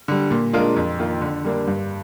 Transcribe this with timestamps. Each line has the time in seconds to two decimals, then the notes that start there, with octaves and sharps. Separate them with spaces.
0.08 D3 G3
0.31 A#2
0.53 G#3 D4 F4 A#4
0.76 F2
0.99 D#3 A#3 F4
1.21 D3
1.44 G3 A#3 D4
1.67 G2